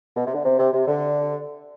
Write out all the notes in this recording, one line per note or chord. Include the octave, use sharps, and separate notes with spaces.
B2
C3
D3
C3
C3
C3
D3